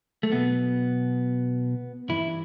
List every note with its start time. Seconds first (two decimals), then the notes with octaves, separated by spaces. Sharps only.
0.23 A3
0.31 B1 B2 B3
2.09 G2 E3 E4